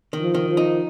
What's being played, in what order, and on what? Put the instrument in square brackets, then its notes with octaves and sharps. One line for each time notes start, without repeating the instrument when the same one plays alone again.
[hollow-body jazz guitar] D#3
[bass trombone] F3
[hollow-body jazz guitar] D#3
[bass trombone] F3
[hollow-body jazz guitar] D#4